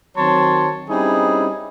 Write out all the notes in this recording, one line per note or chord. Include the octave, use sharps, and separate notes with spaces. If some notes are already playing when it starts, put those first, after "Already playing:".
D#3 F#3 C4 C#5 A5 C6
G3 C4 C#4 D#4 E4 G#4